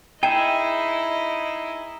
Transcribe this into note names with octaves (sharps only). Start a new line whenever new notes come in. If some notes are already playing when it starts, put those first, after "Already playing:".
D#4 E4 G#4 D#5 E5 G5